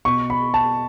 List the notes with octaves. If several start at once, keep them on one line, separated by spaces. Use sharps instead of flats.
B2 C#6
B5
A5